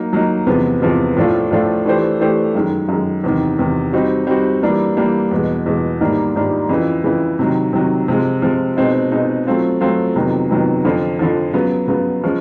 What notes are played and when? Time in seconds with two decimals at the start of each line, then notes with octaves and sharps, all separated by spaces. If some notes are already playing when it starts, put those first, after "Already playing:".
Already playing: F#3 A#3 D#4
0.13 F#3 A#3 D#4
0.47 E2 C3 F3 G#3 B3
0.82 E2 C3 F3 G#3 B3
1.16 A2 F3 A3 D4 F4
1.51 A2 F3 A3 D4 F4
1.86 E3 A3 D4 G4 C5
2.20 E3 A3 D4 G4 C5
2.55 F#2 D#3 G#3
2.89 F#2 D#3 G#3
3.24 E2 C3 D#3
3.58 E2 C3 D#3
3.93 G3 C4 D#4 F#4
4.27 G3 C4 D#4 F#4
4.63 E3 G3 A#3 D4
4.96 E3 G3 A#3 D4
5.31 E2 B2 G#3
5.66 E2 B2 G#3
6.00 G#2 D#3 G3 A#3 D4
6.36 G#2 D#3 G3 A#3 D4
6.69 F2 C#3 E3
7.04 F2 C#3 E3
7.39 C3 D#3 F#3
7.73 C3 D#3 F#3
8.08 C3 F3 G#3
8.42 C3 F3 G#3
8.77 B2 G#3 C4 D#4
9.12 B2 G#3 C4 D#4
9.47 F#3 A3 C4 F4
9.81 F#3 A3 C4 F4
10.16 F2 C3 D#3 F#3 B3
10.50 F2 C3 D#3 F#3 B3
10.85 F2 D3 F3
11.19 F2 D3 F3
11.53 C#3 F#3 B3
11.88 C#3 F#3 B3
12.24 F3 G#3 C#4